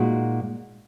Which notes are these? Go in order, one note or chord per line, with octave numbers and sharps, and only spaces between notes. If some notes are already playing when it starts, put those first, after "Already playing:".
Already playing: A#2 G#3 D#4 F#4